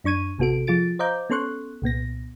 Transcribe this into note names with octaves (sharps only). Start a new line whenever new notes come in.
F#2 D4 C#6 G#6 D#7
A1 C3 B3 F#4 A4 D7
F3 F4 G#4 A6 D7
C5 D#5 F5 A#5 D6 G6
B3 C#4 A4 C6 C#6 F#6
C2 A#2 B3 A#6